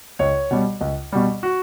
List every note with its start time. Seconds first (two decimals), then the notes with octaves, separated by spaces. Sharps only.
0.19 C#2 C#5
0.51 B2 G3
0.81 C#2
1.12 B2 G3
1.43 F#4